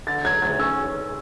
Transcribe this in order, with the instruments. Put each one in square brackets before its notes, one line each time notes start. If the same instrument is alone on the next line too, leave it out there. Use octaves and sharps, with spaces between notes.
[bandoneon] D3 [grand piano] A6
[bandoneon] F#3 [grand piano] G#6
[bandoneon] D2 [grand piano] G#6
[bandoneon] C#4 [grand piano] E6